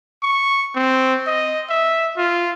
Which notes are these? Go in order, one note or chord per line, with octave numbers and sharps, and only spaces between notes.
C#6
C4
D#5
E5
F4